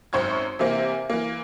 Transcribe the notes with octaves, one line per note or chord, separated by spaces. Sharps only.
G#1 F#2 C5 C#6 G#6
C3 E3 A#3 C4
E3 A#3